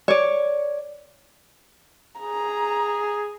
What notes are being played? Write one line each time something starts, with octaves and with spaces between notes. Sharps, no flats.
C#5 D5
G#4 A#5